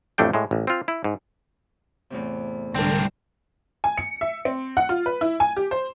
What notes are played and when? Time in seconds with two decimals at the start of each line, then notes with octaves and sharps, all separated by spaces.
0.18 A1 F2 A3 D4 G5
0.34 A2 G#3
0.51 A1
0.67 C4 F4
0.88 E4
1.04 G#2
2.10 E2 A2 C3
2.75 C2 G#2 D3 C4 D4 A#4
3.84 G#5
3.98 C#7
4.21 E5
4.45 C4
4.77 F#5
4.89 F4
5.06 B4
5.21 E4
5.40 G#5
5.57 G4
5.71 C5